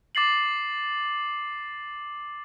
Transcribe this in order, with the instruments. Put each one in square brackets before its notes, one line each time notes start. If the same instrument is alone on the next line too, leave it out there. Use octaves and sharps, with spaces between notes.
[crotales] D6 A6 C7 F#7